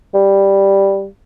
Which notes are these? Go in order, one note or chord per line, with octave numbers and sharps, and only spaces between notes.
G3